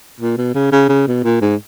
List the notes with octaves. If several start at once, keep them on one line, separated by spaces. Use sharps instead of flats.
A#2
B2
C#3
C#3
C#3
B2
A#2
G#2